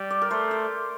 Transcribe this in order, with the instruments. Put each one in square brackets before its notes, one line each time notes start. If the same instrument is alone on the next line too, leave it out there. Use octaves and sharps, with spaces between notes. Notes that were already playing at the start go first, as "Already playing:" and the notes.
Already playing: [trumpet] G3
[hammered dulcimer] D5
A#4
[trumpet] A3 [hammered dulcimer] C5
[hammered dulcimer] D5